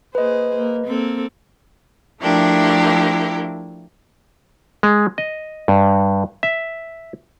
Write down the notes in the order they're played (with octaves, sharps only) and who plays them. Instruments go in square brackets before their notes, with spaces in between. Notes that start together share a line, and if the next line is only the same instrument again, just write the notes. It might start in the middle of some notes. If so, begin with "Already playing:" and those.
[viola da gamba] A#3 G#4 C5 [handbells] B4 D#5
[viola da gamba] A#3
A#3 C4 A4
[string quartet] F3 A3 D4 E4 G4 A#4
[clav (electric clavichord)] G#3
D#5
G2
E5